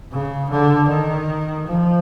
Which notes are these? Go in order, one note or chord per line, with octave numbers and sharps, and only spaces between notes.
C#3
D3
D#3
F3